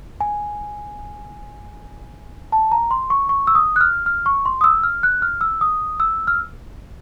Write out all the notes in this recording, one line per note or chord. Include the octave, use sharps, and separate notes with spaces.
G#5
A5
A#5
C6
C#6
C#6
E6
D#6
F#6
F6
F6
C#6
C6
D#6
E6
F6
F#6
F6
E6
D#6
E6
F6